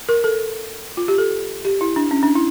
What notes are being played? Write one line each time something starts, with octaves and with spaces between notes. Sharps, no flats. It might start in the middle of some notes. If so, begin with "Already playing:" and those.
A#4
A4
F4
G4
A4
G4
E4
D4
C#4
D4
E4